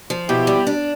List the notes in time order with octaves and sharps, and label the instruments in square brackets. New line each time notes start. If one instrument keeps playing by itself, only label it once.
[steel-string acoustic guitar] F3
[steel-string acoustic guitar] B2 [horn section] E4 G4
[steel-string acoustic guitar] G3
D4